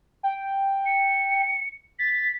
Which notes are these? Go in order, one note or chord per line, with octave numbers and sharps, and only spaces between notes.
G5
C#7
A6 B6